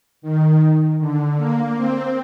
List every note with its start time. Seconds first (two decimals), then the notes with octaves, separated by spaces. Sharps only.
0.22 D#3
0.99 D3
1.37 A#3
1.76 C4